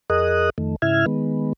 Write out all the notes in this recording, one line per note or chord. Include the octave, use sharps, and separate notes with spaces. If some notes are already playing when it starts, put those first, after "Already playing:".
F2 G#4 A#4 D#5 D#6 F#6
F2 D#3 A3
G#2 C#3 E4 E5 F6 G#6
D#3 G#3 B3